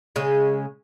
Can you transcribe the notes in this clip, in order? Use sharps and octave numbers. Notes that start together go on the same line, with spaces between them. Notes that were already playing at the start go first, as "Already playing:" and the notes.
C#3 G#3